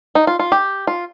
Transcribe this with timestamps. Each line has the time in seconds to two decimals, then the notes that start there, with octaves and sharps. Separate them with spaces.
0.15 D#4
0.27 F4
0.39 F4
0.52 G4
0.87 F4